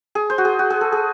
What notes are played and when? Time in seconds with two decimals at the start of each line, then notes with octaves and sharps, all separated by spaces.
0.15 G#4
0.30 C5
0.38 F#4
0.45 G#4
0.59 F#4
0.70 G#4
0.81 A4
0.92 G#4